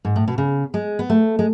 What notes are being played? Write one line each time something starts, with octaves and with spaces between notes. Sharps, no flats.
G#2
A2
B2
C#3
G#3
B3
A3
G#3